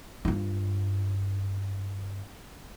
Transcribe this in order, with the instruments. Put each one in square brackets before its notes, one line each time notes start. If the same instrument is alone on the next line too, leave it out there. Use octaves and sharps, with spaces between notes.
[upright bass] G2 F4